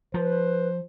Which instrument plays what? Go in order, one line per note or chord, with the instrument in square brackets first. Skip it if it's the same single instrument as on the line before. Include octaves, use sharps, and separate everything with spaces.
[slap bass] F3 [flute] B4 [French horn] C5